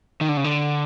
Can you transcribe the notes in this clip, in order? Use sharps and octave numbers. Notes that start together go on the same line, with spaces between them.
D#3
D3
C#3
D3